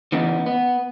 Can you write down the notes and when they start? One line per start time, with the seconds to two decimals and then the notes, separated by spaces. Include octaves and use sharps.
0.12 E2 C#3 E3 B3 D#4
0.46 B3